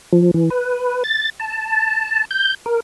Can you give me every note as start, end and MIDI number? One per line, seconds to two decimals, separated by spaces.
0.13 0.31 53
0.34 0.50 52
0.50 1.03 71
1.04 1.30 93
1.40 2.25 81
2.31 2.54 91
2.66 2.80 70